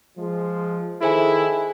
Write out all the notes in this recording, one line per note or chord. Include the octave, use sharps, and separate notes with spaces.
F3 G#3
D#3 E4 G#4 A4 C5 G#5